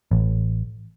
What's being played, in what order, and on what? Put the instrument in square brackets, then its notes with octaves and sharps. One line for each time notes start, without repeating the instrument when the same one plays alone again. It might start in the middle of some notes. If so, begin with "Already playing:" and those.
[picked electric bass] A1